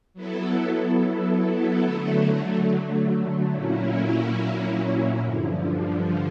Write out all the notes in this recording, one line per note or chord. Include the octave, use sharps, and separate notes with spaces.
F#3 B3 E4 A4
D3 F#3 A3
A#2 F#3 A#3 C#4 E4
G2 D3 F3